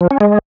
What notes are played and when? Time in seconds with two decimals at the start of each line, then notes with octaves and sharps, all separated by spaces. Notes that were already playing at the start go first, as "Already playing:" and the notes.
0.01 F3
0.11 C#4
0.20 G#3